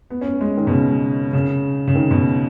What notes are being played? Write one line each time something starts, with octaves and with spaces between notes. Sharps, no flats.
B3
C#4
B3
G#3
D#3
B2
C#3
C#3
C#3
D#3
B2